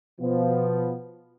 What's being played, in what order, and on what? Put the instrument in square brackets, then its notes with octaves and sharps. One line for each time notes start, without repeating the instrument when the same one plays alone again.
[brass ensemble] B2 F3 B3